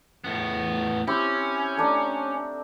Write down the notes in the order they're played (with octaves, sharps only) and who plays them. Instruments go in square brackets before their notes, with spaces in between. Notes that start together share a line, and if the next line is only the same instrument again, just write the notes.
[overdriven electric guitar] A2 B3
[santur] C4 E4 G4 [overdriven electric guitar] C#4
[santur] A3 D4 D#4